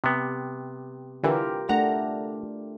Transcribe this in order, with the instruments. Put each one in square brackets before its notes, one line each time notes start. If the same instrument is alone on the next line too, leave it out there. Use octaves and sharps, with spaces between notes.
[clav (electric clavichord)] C3 B3 [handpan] G4
[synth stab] D3 E3 [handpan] F4 G4 A#4
[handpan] A3 D4 [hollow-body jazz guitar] F#5 [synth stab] A#5